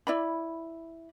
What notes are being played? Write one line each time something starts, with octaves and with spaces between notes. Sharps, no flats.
E4 D5 B5